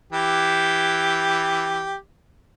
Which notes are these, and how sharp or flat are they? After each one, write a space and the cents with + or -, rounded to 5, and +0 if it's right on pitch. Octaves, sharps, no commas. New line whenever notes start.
E3 +0 G4 +0